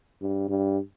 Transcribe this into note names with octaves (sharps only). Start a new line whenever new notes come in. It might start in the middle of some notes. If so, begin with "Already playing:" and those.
G2
G2